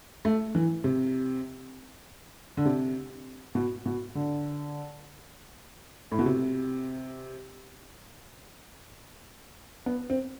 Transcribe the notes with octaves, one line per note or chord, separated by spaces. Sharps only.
A3
E3
C3
D3
C3
B2
B2
D3
A2
B2
C3
B3
C4